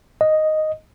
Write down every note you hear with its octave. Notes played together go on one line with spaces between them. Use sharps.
D#5